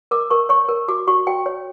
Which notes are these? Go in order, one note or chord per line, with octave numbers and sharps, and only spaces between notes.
A#4 D6
A#4 C#6
C#5 C#6
A#4
F#4 D6
F#4 C#6
F#4 G5
C#5